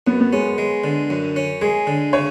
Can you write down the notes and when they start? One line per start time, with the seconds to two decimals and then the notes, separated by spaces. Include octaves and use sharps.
0.07 F#2 B3
0.21 B3
0.33 G#3 C#4
0.58 G#3
0.84 D3
1.10 F#2
1.36 C#4
1.61 G#3 G#4
1.87 D3
2.13 C#3 C#5